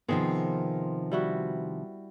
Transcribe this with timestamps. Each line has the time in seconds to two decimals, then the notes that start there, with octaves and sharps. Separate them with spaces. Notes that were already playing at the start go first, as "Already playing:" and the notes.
0.08 C3 D#3 F3 B3 C4 G#4
1.12 G3 E4 F#4